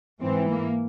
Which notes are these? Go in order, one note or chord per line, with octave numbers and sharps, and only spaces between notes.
G#2 E3 C4
A#3